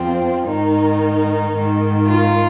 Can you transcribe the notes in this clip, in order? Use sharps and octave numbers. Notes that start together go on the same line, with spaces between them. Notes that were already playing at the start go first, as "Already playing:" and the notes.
Already playing: F2 F3 C4
G#2 D#3 D#4
G#2 D#3
F4